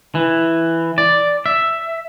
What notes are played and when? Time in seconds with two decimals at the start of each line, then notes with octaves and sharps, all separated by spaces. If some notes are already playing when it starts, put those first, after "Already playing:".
0.15 E3
0.98 D5
1.46 E5